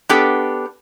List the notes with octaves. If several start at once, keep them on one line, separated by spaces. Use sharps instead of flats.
B3 D4 G4 A4